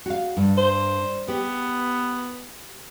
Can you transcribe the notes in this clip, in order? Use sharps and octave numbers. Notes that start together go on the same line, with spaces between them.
F#4 F5
G2
C5
B3 G4